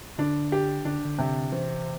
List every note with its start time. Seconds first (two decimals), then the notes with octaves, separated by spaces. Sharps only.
0.19 D3 D4
0.52 G4
0.85 D3 D4
1.05 D3
1.19 C3
1.52 E3 C4